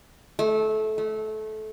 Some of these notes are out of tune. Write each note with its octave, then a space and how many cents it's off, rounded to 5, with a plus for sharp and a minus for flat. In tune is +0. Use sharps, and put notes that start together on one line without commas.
A3 -20
A3 -20